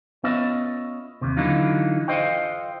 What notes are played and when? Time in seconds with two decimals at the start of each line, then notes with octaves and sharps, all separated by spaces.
0.24 B3 C#4 F4 D#5 E5
1.21 D#2 C3
1.37 D3 E3 F#3 D#4 F4
2.08 F4 A4 C5 D#5 F#5 G5